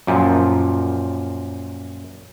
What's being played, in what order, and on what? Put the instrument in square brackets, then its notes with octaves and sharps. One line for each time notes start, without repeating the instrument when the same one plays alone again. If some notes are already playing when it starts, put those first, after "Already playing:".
[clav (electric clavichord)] F#2 A#2 F3